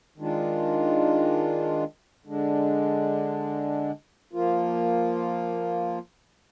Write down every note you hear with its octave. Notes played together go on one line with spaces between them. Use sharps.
D#3 G#3 D4 F4
D3 G#3 D4
F3 A#3 F4